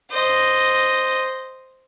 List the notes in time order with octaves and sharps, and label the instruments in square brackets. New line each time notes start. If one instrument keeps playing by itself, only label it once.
[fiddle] C5 D#5